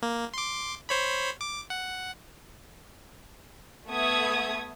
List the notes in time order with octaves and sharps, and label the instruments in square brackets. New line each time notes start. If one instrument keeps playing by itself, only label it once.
[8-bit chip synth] A#3
C6 D6
C5 C#5 B5
D6
F#5
[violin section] A3 B3 E5 D#6 G#6